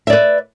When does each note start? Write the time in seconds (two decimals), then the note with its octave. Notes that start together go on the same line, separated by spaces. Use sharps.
0.07 E5
0.10 D5
0.13 B4